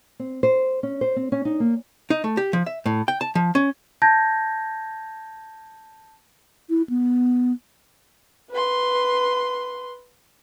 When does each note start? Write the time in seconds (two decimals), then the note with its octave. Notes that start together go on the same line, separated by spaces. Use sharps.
0.19 C4
0.43 C5
0.83 C#4
1.01 C5
1.16 C4
1.32 C#4
1.45 D#4
1.60 A#3
2.10 D#4
2.24 A3
2.37 G4
2.53 F3
2.66 E5
2.86 A2
3.08 G5
3.21 A5
3.35 F3
3.55 C#4
4.02 A5 G6 G#6 A#6
6.70 E4
6.90 B3
8.50 B4 C6